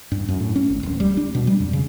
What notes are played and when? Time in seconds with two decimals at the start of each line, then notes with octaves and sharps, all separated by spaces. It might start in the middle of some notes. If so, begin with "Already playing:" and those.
0.12 G2
0.28 F#2
0.40 A2
0.56 C#4
0.69 G#1
0.83 D1
1.00 G3
1.17 D4
1.35 B2
1.47 G3
1.60 F2
1.73 C#3